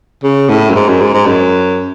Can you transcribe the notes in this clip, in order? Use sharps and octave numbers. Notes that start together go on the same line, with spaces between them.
C#3
A2
F#2
G#2
F#2
G#2
G#2
F#2